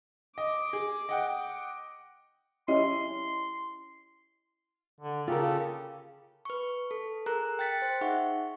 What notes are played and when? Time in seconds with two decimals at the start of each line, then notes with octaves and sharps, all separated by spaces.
0.38 D#5 D6
0.73 G#4
1.09 D#5 F#5 G5
2.68 C#4 E4 G4 D#5 C6
5.01 D3
5.28 C#3 A#3 F4 G4 A4 A#4
6.45 B4 C#6
6.91 A4
7.26 G#4 A#4 A#5 F#6
7.59 G5 F#6 A6 B6 C#7
7.82 C5
8.01 D#4 G#4 E5 F#5 C#6